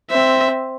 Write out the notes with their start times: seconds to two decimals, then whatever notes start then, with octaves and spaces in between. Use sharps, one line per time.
0.10 C4 E5